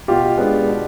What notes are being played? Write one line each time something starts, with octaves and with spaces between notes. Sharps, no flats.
B2 F4 G4
G#3 B3 D4
B2